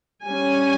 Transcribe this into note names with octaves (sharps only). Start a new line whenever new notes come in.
G3 C#4 G#5